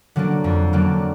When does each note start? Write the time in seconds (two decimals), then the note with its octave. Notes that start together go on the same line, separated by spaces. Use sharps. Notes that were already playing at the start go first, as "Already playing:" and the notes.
0.16 D3 F#3 A#3 D4
0.44 F2
0.73 D3 F#3 A#3 D4